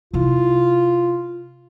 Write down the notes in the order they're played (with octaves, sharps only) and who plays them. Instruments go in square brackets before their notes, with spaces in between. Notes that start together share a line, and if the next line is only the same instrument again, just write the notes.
[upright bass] C3 E4 [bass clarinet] F4